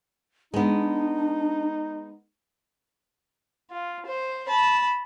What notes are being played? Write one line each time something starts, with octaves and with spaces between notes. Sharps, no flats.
G#3 B3 D4 D#4
F4
C5
A5 B5